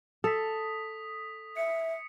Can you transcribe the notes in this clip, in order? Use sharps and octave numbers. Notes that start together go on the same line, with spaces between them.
A4 D#6 B6
E5 C#7